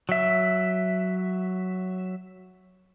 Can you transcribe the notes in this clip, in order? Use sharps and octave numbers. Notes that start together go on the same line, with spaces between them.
F#3 E5